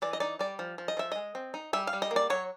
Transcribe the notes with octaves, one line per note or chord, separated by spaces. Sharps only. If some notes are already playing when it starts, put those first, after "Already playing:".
E3 D5
D#5
D#4 D5
G3 D5
F3
F3
D#5
F3 E5
G#3 D#5
C4
D#4
G3 E5
F5
G3
D#5
A#3
D5
F#3 C#5